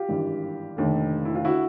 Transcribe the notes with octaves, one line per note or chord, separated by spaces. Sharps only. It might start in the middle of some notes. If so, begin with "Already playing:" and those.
Already playing: F4 G4
G#1 G2 E3
F1 D#2 D3
E4
F4
D3 E4 F#4